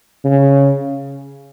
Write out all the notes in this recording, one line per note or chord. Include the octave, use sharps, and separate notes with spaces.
C#3